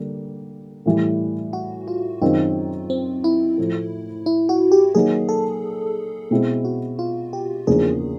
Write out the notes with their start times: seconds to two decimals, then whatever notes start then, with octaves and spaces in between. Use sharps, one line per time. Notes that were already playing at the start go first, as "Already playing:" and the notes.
Already playing: D3 G3 A#3
0.86 A2 E3 G3
1.53 F#4
1.88 F4
2.21 F#2 D#3 G#3 C4 D#4 F4
2.90 C4
3.24 E4
3.58 A2 F3 A3
4.26 E4
4.49 F#4
4.72 G4
4.94 D#3 F#3 A#3 D#4 G#4
5.29 A4
6.31 B2 G#3 C4 E4
6.65 F#4
6.99 F4
7.33 G4
7.67 E2 C#3 F3 A#3 D4 G#4